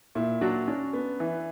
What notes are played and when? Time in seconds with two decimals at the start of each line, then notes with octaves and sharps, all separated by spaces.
0.15 A#2 E4
0.41 F#3 D4 F#4
0.68 C#4 D4
0.93 B3
1.20 E3